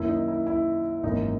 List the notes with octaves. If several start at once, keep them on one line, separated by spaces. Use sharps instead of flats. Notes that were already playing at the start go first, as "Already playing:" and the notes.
Already playing: F#2 D#3 A#3 E4
D#4
E4
E4
G#1 F#2 E3 A#3 D#4